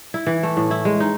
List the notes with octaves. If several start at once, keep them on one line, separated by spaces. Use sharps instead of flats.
E4
E3
A3
A2
E4
G#3
D#4